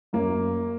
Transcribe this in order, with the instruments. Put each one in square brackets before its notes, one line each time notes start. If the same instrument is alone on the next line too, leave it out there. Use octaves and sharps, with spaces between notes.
[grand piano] F#2 [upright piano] A#3